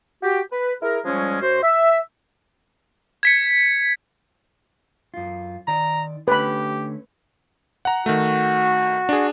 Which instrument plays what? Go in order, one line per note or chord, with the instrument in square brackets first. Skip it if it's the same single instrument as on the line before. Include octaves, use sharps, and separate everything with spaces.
[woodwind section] F#4 G4
B4
E4 G#4 A#4
F3 G3 G#3 C#4
F#2 F#4 C5
E5
[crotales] G#6 B6 C#7
[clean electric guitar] F#2 F4
[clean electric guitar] D#3 D5 [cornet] A#5
[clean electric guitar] D3 A3 C#4 [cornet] G4 [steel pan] B4 B5
[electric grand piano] F#5 A#5
[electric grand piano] D#3 A3 [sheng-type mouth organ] F#4
[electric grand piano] D4 G#4